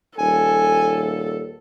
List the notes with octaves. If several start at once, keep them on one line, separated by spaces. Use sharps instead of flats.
D#1 A4 G#5